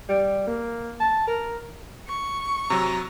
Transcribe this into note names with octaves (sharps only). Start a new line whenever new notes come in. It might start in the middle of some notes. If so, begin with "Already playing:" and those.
G3
A#3
A5
A#4
C#6
C3 F#3 A#5